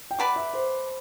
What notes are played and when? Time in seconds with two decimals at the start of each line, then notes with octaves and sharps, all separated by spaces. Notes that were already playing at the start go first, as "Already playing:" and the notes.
0.11 G5
0.19 B4 D5 F#5 A5 D6
0.36 E5
0.53 C5